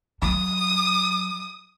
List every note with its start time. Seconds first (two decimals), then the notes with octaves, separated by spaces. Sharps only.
0.22 F#3 D#6